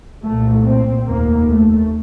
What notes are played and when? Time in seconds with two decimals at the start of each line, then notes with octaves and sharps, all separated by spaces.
0.23 C2 A#2 A3
0.65 C4
1.06 F1 D#2 A#3
1.48 A3